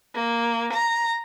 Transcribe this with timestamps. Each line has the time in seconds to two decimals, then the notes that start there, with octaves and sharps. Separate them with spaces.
0.15 A#3
0.73 A#5